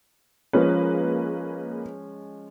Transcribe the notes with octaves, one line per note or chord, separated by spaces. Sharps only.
F3 G#3 A#3 C#4 G#4 B4